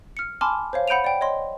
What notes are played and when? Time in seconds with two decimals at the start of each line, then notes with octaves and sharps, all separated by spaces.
0.17 F6 C#7
0.41 G#5 A5 B5 C6 D6 F6
0.73 C5 C#5 F5
0.88 F#5 B5 G6 D7 D#7 F7
1.04 D5 G5
1.21 C#5 D#5 C6